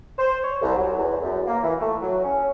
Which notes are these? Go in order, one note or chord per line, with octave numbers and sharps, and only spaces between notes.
C5
C#5
C2
F#3
E2
F#2
A#3
E3
A3
F#3
C#4